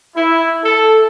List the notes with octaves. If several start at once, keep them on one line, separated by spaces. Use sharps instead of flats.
E4
A4